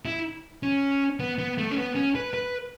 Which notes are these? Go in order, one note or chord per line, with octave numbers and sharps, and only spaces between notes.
E4
C#4
B3
B3
A3
C#4
B3
C#4
B4
B4